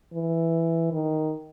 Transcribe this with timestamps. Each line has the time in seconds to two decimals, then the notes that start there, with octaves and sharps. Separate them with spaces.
0.13 E3
0.92 D#3